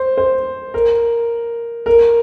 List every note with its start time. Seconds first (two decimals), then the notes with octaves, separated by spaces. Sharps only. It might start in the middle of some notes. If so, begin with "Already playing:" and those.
Already playing: C5
0.18 C5
0.74 A#4
1.86 A#4